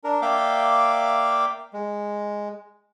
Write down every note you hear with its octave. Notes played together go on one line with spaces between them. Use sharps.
D4 A#4
A#3 D5 E5 F5 G5 D6
G#3